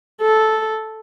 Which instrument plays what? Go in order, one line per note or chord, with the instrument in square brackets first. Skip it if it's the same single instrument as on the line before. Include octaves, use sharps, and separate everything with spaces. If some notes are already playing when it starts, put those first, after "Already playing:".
[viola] A4